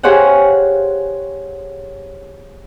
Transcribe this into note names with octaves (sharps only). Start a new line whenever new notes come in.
G4 G#4 C5 C#5 F5 F#5